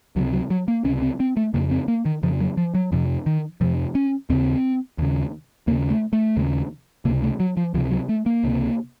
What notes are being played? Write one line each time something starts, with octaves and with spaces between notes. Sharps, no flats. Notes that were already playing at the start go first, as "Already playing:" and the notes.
C#2 C3 F#3
F#3
F#3
A#3
C#2 C3 C#4
C4
C4
A3
F2 C#3 A#3
C4
A#3
D#3
F2 C#3 F3
F#3
F3
F#3
F2 C3 F3
D#3
F2 C3 F3
C#4
D#2 C#3 C4
D#2 C#3
D#2 C#3 A#3
A3
A3
D#2 C#3
C#2 C3 A#3
A3
F#3
F3
C#2 C3 F3
F#3
A3
A#3
C#2 C3